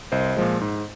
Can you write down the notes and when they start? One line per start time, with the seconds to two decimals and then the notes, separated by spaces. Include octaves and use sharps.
0.12 C2 C5 D#5
0.36 A#2 F3 G#3
0.61 G#2